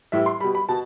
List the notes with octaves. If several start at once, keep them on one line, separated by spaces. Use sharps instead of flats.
A2 E3 G3 E5
C6
B2 G3 B5
B5
B2 A5